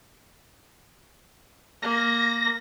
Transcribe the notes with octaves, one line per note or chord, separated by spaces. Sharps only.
A#3 A#6